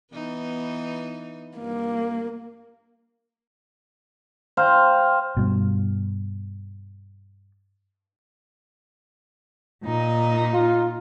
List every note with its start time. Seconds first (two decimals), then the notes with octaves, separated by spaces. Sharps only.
0.13 E3 B3 D#4
1.58 G2 A#3
4.57 C5 F5 G5 A#5
5.37 G2 B2
9.84 A#2 D#4
10.54 F4